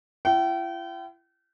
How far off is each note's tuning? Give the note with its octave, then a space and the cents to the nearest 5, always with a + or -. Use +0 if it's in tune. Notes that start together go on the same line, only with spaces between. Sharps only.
E4 +45 G5 -35